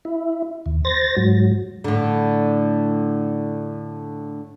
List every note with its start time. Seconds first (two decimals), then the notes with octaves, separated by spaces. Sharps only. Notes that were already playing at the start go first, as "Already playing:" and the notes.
0.05 E4
0.66 D#2
0.85 C5 A6 A#6
1.17 G#2 F#3
1.84 A2 D3